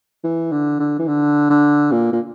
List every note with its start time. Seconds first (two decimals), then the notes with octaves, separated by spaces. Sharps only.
0.24 E3
0.52 D3
0.79 D3
0.99 E3
1.08 D3
1.50 D3
1.92 A#2
2.12 A#2